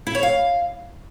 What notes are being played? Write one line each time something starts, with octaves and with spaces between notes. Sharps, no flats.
E4
C#5
F5